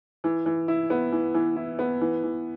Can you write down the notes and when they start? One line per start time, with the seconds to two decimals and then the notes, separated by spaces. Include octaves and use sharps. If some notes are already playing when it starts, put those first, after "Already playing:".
0.24 E3
0.46 E3
0.68 E4
0.90 B3
1.12 E3
1.34 E3
1.56 E4
1.79 B3
2.01 E3
2.23 E3